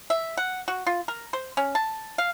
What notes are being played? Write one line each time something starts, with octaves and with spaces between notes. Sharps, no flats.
E5
F#5
F#4
F4
A#4
C5
C#4
A5
F5